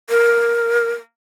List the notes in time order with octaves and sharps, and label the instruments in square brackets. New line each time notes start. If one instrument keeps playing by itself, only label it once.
[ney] A#4